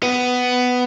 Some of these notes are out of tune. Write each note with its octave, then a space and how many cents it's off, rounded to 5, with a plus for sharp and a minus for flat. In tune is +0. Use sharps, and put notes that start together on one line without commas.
B3 +10